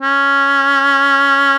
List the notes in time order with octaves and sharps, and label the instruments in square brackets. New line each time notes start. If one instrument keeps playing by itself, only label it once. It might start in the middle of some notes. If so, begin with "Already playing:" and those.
[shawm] C#4